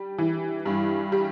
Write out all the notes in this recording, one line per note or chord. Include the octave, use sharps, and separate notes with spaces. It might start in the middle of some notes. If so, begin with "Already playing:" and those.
Already playing: G3
E3
G2
G3